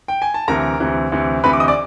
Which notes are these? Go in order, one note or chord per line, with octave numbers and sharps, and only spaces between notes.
G5
G#5
A5
D2 C3 E3 A#4 A#5
D2 C3 E3
D2 C3 E3
D2 C3 E3 B4 B5
D6
D#5 D#6
D5 D6